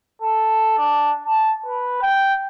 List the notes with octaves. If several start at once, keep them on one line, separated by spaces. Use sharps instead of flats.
A4
D4
A5
B4
G5